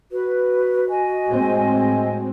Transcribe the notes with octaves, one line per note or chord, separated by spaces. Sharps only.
F#4 B4
D#5 G#5
A2 G#3 C4